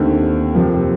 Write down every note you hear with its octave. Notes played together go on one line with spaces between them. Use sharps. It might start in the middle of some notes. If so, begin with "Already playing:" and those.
Already playing: D#2 D3 A3 C4
F2 C3 F3 A#3